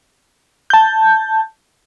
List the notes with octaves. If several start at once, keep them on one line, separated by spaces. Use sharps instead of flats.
A5 G6